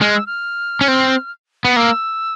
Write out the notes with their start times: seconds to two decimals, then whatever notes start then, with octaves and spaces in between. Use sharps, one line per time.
0.01 G#3 F6
0.15 E6
0.27 F6
0.81 C#4
0.88 C4
1.65 B3
1.76 A#3 E6